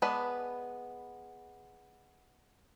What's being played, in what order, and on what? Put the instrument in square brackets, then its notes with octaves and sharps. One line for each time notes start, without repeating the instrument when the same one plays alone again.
[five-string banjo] G#3 B3 B4 D5 A5